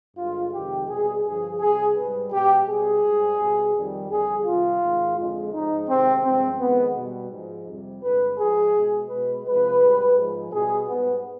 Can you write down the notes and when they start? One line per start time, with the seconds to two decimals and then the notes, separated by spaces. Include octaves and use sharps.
0.17 G2 D3 G#3 F4
0.53 F2 C3 D#3 G#3 G4
0.89 B2 G3 G#4
1.24 G2 D3 F3 G#4
1.60 C3 G3 G#4
1.96 G#2 G3 B4
2.32 B2 G#3 G4
2.67 B2 G3 G#4
3.03 G#2 G3
3.39 B2 G3
3.75 F2 D#3 G3
4.09 F2 D3 G3 G#4
4.45 C3 D#3 G3 F4
4.81 G#2 D#3 G#3
5.17 F2 D3 G#3
5.52 G#2 F3 G#3 D#4
5.88 C3 D#3 G#3 C4
6.24 G2 F3 G#3 C4
6.59 F2 D#3 G#3 B3
6.95 B2 G3
7.31 G#2 F3 G#3
7.66 F2 C3 G3
8.03 G2 D3 G#3 B4
8.38 G#2 F3 G#3 G#4
8.74 B2 G#3
9.09 B2 G#3 B4
9.45 C3 F3 G#3 B4
9.81 G#2 G3
10.16 G#2 F3 G#3
10.52 B2 G3 G#4
10.88 G#2 G3 B3